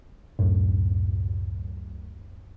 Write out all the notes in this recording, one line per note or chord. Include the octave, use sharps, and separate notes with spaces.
C#2 F#2 A2